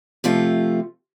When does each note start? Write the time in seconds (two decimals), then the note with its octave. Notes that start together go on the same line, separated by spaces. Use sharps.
0.24 C3 F3 A3 F4